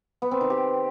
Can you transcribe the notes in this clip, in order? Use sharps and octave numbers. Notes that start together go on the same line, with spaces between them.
B3
C4
D#3
G4